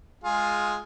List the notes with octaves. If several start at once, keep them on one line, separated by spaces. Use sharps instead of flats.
G#3 F4 G#4